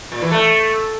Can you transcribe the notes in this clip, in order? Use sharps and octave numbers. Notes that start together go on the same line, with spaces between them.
A#2
E3
A3